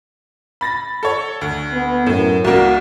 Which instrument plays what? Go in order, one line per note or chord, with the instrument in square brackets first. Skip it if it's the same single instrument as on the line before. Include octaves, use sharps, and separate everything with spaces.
[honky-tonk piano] B5 A6 A#6
A4 C#5
D2
[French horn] B3
[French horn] F#2 [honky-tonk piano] A2
[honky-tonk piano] C2 A#3 [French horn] F#4